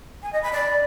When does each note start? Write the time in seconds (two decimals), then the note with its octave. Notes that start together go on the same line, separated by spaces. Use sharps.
0.23 G#5
0.33 D#5
0.43 B5
0.53 D5